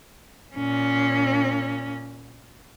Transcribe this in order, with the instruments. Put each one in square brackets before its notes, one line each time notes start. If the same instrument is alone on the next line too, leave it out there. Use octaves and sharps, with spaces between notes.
[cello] A#2 C#4